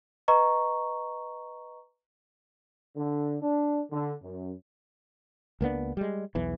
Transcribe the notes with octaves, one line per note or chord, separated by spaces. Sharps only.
B4 D#5 A#5 C#6
D3
D4
D3
F#2
C#2 A#3 B3 D4
G3 G#3
B1 E2 E3